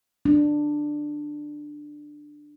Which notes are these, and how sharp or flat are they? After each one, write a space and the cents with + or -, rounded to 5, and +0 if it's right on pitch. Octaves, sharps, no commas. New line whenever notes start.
D4 +10